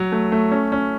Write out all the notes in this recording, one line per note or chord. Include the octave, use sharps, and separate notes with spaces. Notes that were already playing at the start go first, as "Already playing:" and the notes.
Already playing: F#3
A3
A3
C#4
C#4